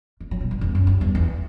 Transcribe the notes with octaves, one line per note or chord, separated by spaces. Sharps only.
A3
F#3
B2
G2
E2
F#2
G2
E2
E2